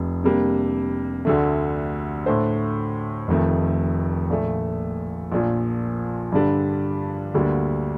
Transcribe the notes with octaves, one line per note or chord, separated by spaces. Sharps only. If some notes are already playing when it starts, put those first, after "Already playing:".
Already playing: F1 F2 C3
C3 G3 A#3 D4
D2 D3 A3
A2 A3 D4 A4 C5
F1 F2 D#3 A3
A#1 A#2 A3
A#1 A#2 F3
G2 D3 G3 D4
D2 D3 G3 A#3 D4